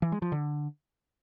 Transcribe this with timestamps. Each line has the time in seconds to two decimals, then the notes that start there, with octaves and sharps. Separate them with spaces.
0.02 E3
0.12 G#3
0.22 F3
0.32 D3